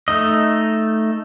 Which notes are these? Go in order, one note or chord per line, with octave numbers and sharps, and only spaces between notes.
A3 D#4 D#5